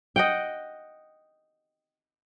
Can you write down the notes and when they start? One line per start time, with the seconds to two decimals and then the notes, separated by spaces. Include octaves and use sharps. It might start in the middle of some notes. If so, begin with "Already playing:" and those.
0.16 D#5 F#5 G5